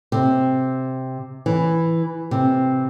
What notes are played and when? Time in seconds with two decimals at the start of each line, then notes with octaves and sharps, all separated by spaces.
0.12 C3
1.46 E3
2.31 C3